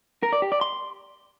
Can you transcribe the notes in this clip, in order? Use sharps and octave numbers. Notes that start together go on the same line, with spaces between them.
A#4
D5
G4
D5
C6